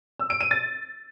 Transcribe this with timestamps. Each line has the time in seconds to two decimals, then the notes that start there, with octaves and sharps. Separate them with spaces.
0.19 E6
0.30 D7
0.41 D#7
0.51 A6